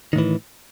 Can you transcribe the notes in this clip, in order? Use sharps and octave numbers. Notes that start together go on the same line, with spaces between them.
A2 D#3 E3